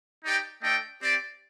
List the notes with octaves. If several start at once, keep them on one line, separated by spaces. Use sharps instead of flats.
D#4 G4 D5 G5
A3 D4 A4 D#5 G5
C4 G4 D5